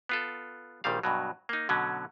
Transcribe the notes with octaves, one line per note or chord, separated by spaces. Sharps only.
B3 F4 A4
A#1 A#2 D#3 G3 F5
G2 B2 F#3
A#3 D#4
B2 D3 F#3 C#4